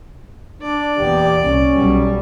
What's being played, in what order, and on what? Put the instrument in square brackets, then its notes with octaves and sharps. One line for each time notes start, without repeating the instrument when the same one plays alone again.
[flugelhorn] D4 [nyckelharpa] D5
[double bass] E2 A#2 [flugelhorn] G4
[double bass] C2 [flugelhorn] C#4
[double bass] B1 G3